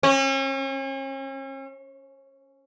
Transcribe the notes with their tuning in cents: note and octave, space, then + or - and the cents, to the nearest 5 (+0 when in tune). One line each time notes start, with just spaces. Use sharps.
C#4 -40